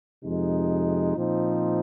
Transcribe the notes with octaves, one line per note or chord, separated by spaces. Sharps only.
F2 C3 G#3 D#4
A#2 F3 C4 D#4